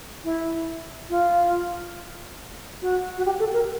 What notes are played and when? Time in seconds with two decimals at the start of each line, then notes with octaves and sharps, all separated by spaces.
0.24 E4
1.10 F4
2.82 F#4
3.18 F#4
3.26 G4
3.40 A4
3.53 A#4